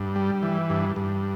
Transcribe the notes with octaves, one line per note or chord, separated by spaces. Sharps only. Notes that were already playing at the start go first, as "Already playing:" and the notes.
Already playing: G2
G3
E3
G2
G2